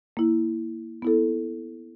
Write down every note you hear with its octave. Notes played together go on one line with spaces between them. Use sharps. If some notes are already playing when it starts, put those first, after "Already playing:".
A#3 E4
B3 E4 A4